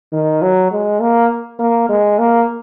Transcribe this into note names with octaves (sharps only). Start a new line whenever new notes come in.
D#3
F#3
G#3
A#3
A#3
G#3
A#3